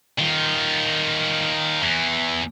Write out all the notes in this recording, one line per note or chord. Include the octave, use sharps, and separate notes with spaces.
D#3 F4
E2 E3